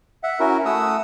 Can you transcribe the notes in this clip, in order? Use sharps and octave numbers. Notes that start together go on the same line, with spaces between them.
E5 F#5
C#4 E4 F#4 A#4
A3 F#5 D#6 E6